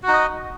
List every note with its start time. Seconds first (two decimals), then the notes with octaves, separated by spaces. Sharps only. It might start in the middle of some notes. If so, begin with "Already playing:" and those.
0.03 F#4
0.08 D#4
0.13 D#5